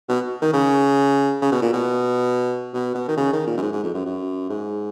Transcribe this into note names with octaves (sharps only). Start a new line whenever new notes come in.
B2
D#3
C#3
C#3
B2
A#2
B2
B2
B2
D#3
C#3
D#3
A#2
F#2
G#2
G#2
F2
F#2
F#2
G#2